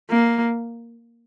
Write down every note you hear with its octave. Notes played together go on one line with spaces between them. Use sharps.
A#3